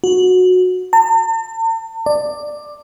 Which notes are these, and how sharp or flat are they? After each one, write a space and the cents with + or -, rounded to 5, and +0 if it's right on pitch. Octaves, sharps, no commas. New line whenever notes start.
F#4 -15
A5 +45
D5 +10